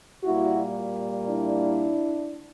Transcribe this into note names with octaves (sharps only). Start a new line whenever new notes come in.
A#2 G3 A#3 E4 F#4
D4 E4